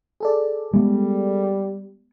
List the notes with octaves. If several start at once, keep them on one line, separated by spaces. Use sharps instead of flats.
G#4 A4 D5
G3 G#3 B3